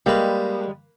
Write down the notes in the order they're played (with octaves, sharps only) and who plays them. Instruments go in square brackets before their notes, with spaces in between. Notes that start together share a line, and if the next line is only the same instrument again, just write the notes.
[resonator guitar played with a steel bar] G3 G#3 [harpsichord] A#3 B4